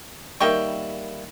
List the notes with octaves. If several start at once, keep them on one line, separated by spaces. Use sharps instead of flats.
D#3 G3 A#3 E4 G5 C#6